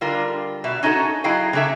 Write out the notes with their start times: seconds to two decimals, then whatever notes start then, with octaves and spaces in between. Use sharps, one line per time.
0.01 D3 G3 F4 A#4
0.64 B2 E5
0.83 C#4 D#4 F#4 G#4 A4
1.24 F#3 E4 G#4 D#5 F5 G5
1.53 C#3 A#3 D4 A4 E5